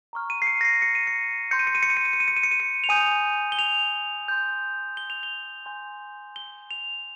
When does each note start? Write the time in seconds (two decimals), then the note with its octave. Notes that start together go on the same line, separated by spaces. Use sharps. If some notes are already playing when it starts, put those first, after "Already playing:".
0.13 A#5 C#6 F6
0.30 D#7
0.42 C7
0.47 C#7
0.61 A#6
0.65 C7
0.82 C#7
0.95 D#7
1.07 C#7
1.51 C6 G6 C#7
1.59 D#7
1.67 C#7
1.75 D#7
1.83 C#7
1.90 D#7
1.97 C#7
2.05 D#7
2.13 C#7
2.20 D#7
2.28 C#7
2.37 D#7
2.43 C#7
2.51 D#7
2.60 C#7
2.84 F7
2.89 G#5 D#6 G6 D#7
3.52 G7
3.59 F7
4.28 C6 G6
4.97 G7
5.10 F7
5.23 G7
5.66 G#5 C6 G6
6.36 G7
6.71 F7